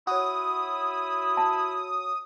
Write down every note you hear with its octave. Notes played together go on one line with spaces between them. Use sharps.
E4 F#4 C#5 D#6
A5